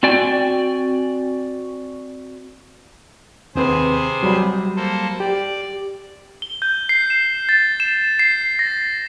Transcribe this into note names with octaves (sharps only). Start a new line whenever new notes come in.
C4 F#4 D5 G5 G#5
D#2 C3 C4 G#4 B4 C5
F#3 G3 B5
A#3 A4 C5
G4 D5
G7
G6
C7
E7
A6
E7
C7
A#6